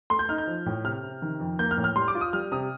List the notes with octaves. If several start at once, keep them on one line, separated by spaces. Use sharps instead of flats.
A3 C6
G6
D#4 F6
G6
F3
A2
C3 F6
C3
D#3
F2
A#3 G6
F6
A2
F6
G3 C6
D6
F4
D#6
G3 F6
C3 D#6